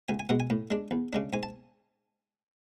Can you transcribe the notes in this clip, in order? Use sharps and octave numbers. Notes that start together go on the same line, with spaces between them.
C#2 G#5
G#5
B2 G#3 F#5
G#5
A2
G#3 D4
E2
C#3 G#3 D4
G#2 G#5
A5